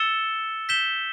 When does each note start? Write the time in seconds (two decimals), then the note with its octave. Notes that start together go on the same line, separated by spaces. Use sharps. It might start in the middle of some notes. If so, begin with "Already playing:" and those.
Already playing: E6 A6 C#7 E7 G7
0.69 G6 B6 E7 G7